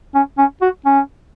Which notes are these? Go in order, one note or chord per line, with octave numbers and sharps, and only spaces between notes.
C#4
C#4
F#4
C#4